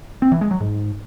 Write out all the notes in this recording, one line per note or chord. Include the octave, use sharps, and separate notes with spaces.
C4
E3
G#3
F#3
G#2